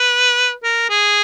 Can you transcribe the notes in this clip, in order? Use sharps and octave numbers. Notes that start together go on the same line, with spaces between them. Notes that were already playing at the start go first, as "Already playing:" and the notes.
Already playing: B4
A#4
G#4